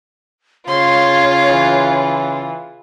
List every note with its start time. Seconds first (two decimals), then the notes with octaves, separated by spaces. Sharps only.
0.69 C#3 F4 C#5 C6
1.48 E3